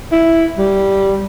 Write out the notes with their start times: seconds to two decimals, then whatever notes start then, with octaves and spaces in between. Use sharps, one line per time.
0.12 E4
0.58 G3